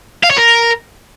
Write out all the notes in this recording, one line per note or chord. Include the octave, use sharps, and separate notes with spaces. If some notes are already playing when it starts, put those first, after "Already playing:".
F5
C#5
A#4